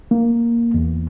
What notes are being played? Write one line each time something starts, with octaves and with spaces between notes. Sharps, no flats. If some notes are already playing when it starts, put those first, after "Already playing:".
A#3
E2